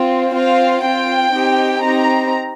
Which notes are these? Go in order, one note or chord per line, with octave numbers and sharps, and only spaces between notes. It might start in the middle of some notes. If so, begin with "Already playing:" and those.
Already playing: C4 F4
C4 F4 F5
C4 F4 G5
C4 D#4 G4
C4 D#4 G4 A#5